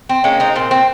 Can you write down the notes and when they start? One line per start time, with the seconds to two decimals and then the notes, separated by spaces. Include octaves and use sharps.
0.09 C4
0.24 G#3 A#3 C#4
0.40 C4 D#4
0.56 A#2 C4
0.71 C4